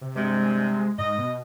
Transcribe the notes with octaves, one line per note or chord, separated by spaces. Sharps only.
C3
G2 C3 G#3
G#2 D#5
B2